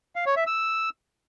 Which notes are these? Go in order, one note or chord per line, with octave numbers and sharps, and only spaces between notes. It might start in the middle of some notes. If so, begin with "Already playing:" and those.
F5
C#5
E5
E6